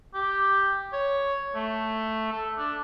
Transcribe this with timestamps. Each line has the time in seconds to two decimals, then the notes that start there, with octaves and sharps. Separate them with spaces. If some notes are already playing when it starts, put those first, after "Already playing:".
0.15 G4
0.93 C#5
1.55 A3
2.32 A4
2.58 D4